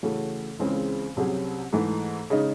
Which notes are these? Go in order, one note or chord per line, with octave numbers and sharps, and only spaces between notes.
C#3 E3 A3 C#4 F#4
C#2 C#3 E3 G#3 C4
C2 C3 F#3 C#4 G#4
G#2 E3 A3
C#3 G#3 D#4